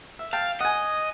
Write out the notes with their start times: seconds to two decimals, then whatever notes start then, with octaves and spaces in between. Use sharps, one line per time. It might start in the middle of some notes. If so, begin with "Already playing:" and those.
0.19 E5
0.33 F5 G5 A5
0.60 D#5 F#5 G#5